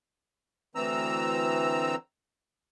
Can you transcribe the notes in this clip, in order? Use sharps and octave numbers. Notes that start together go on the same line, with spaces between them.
D2 E3 C4 A#5 E6